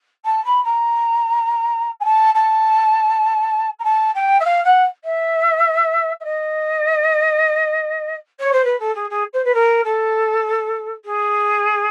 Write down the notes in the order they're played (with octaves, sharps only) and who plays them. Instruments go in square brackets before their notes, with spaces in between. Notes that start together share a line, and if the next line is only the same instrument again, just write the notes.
[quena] A5
B5
A#5
G#5
A5
A5
A#5
A5
G5
E5
F5
F#5
E5
E5
D#5
C#5
C5
B4
A4
G#4
G#4
C5
B4
A#4
A4
G#4